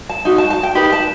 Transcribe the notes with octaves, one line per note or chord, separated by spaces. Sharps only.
A5
D#4 F#4
A5
A5
G5
D#4 G4 B4 B5
A5